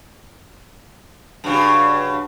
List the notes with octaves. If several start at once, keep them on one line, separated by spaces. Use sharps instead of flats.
G2 C#3 F#4